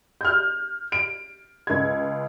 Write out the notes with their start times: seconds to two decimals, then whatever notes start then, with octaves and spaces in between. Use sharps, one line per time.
0.21 F6 G6
0.92 D7
1.67 C#2 G#6